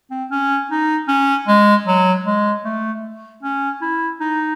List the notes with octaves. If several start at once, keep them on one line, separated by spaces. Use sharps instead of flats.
C4
C#4
D#4
C#4
G#3
F#3
G#3
A3
C#4
E4
D#4